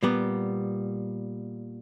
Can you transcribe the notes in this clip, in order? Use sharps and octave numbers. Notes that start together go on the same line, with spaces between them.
A#2 G3 B3